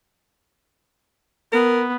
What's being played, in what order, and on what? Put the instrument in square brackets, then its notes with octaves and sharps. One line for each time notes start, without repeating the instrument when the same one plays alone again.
[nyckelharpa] B3 [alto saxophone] A#4